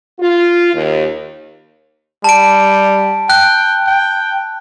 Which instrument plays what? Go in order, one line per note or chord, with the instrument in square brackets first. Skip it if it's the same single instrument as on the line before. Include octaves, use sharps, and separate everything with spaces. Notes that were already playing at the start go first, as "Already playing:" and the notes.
[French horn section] F4
D#2
[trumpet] G3 [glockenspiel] A5 D7
[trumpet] G5 [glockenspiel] F#6
[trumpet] G5